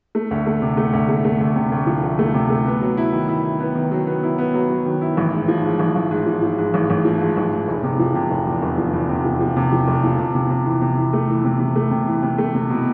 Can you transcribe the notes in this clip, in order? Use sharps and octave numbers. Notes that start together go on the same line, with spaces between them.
A3
D2
A3
C3
A3
D2
A3
A3
D2
C3
D2
F3
D2
A3
C3
A3
B3
F#3
E4
D#3
E4
E4
B3
D#3
F#3
B3
E4
B3
F#3
F#3
D#3
E4
A1
G#2
F3
G#2
A1
A1
G#2
F3
F3
G#2
A1
A1
F3
G#2
A1
G#2
F1
C3
F3
C3
F1
E2
F1
F3
E2
C3
F3
F3
C3
F3
F1
F3
C3
C3
C3
E3
C3
E3
A3
E3
C3
C3
A3
C3
E3
C3
A3
C3
B2